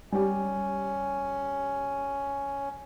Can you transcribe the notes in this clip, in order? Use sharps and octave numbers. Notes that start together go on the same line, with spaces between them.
G3 C#4 G4